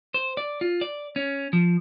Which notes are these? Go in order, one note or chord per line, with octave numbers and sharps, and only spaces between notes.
C5
D5
F4
D5
C#4
F3